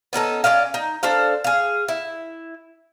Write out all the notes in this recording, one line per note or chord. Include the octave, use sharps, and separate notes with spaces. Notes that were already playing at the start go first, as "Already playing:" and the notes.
B3 C#4 D#4 A4
C#4 D5 D#5 F5
D#4
D4 A4 C5 F5
G#4 F5
E4